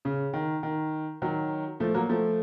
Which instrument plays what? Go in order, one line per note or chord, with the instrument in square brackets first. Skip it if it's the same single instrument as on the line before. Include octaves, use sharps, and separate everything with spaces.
[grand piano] C#3
D#3
D#3
D#3 F#3
F3 A3
F#3 A#3
F3 A3